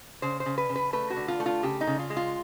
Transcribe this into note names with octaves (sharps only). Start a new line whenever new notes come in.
C#3 C5
C5
C#3
B4
C#3
B4
A3 B4
F#4
D3
F4
A3
F4
C#3 G4
D#4
C#3
F4
G#3
F4